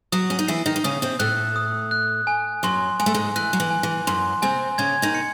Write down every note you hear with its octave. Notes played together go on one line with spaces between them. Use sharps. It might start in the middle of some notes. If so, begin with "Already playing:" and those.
F#3 F#4 D#6
C#4
D#4
E3 E4 C7
D#3 D#4
D#4
C#3 C#4 D#6
C3 C4
A2 A3 F#6
D#6
F#6
G#5
F#2 F#3 C6
G#3 G#5
A3
G#2 G#3
E3 F#6
F#3
E3
G#5
E3
F#2 F#3 C6
C3 C4 G#5
C#3 C#4 G#6
D#3 D#4
C#7